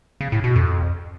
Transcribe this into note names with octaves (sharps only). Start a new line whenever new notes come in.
C#3
A2
B2
F2